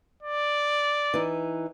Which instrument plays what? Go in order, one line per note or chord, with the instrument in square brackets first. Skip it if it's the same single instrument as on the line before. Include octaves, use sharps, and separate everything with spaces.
[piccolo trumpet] D5
[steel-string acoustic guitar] E3 D#4